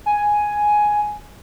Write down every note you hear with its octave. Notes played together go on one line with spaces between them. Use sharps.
G#5